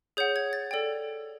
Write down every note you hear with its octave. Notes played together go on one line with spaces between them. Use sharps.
G#4 C#5 F#5 G6
G#6
A6
A4 D5 G5